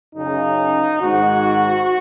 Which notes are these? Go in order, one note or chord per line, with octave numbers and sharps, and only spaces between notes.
F#2 C#3 D#4
G#2 D#3 F#4